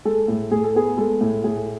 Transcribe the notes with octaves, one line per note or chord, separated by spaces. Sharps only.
G#3 A4
A2
A2 G#4
A4
B3 G#4
G#3 A4
A2
A2 G#4